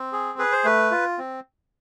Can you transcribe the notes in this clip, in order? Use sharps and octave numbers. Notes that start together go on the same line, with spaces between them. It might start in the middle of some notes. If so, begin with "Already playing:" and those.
Already playing: C4
G#4
G#4 B4
C5
A3 B4
F4
C4